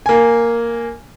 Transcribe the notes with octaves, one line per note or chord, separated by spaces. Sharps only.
A#3 G#5